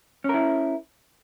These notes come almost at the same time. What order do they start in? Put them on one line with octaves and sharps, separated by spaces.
C#4 A#4 E4